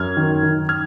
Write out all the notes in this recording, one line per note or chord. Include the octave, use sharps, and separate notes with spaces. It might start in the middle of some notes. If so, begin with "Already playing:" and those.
Already playing: F#2 F6 G#6
D#3
D#3
F6 G#6